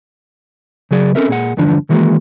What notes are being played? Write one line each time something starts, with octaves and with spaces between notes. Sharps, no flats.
C#3 F#3 G#4 D5
C4 C#4 D#4 A4 A#4 E5
A#2 G#4 F#5
E2 G2 D3 F3 D4
D#3 E3 G#3 A#3 F#4